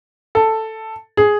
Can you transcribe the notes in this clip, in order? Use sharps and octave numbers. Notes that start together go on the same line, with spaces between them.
A4
G#4